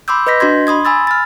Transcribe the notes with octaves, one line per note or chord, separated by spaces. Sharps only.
B5 C6 D6 E6 G6
B4 D#5 G6 A#6 B6
D4 F#4 D#5 C6 G#6
B5 C6 D#6 G#6
G#5 B5 E6 A6
F6 A6